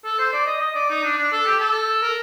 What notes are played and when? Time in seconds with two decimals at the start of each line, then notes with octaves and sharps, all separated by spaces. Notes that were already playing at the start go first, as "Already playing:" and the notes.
0.05 A4
0.19 C5
0.33 D5
0.46 D#5
0.61 D#5
0.75 D5
0.90 D#4
1.04 D4
1.18 D4
1.32 A4
1.46 G4
1.60 A4
2.02 A#4